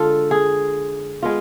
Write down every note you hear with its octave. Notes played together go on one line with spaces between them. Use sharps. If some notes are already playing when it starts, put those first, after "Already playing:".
Already playing: D3 G#3 D4 F4 A4
G#4
G#3 B3 F4